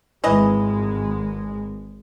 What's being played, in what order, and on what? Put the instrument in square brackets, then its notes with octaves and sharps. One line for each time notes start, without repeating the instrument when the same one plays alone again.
[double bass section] G#1 G#3 [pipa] E3 D#5